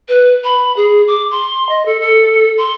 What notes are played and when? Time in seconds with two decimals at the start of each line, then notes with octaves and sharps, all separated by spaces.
0.09 B4
0.44 B5
0.76 G#4
1.07 D6
1.31 C6
1.69 D#5
1.86 A4
2.01 A4
2.58 C6